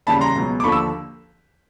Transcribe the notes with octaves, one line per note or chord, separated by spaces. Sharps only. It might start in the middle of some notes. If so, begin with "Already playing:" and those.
D#2 C#3 E3 G3 A5 B5
A#5 C6
C#2 B2 F#3
D6
D#2 D3 F3 B5 C#6
E6